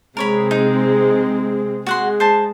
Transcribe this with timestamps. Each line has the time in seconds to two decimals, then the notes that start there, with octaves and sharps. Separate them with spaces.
0.17 C3 G#3 C4 A#4 C#5 B5
0.51 D#4
1.86 G#3 F#4 F#5 C6
2.20 C5 A5